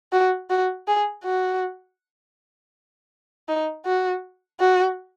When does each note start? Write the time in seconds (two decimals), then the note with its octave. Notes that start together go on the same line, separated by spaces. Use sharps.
0.12 F#4
0.50 F#4
0.88 G#4
1.24 F#4
3.48 D#4
3.85 F#4
4.60 F#4